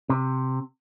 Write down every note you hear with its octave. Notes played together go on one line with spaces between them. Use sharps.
C3